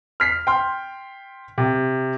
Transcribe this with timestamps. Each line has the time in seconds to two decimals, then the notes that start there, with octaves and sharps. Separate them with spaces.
0.20 F6 B6 C7
0.47 G5 C6 F6
1.58 C3